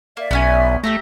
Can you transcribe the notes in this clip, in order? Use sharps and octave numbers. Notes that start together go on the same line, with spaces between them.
A#3 D5 E5
B1 B3 C#4 G#5
A3 G4 E5 A#5